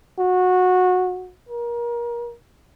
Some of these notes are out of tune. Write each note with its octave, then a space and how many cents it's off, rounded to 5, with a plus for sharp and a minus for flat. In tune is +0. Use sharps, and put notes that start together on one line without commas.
F#4 -20
A#4 +30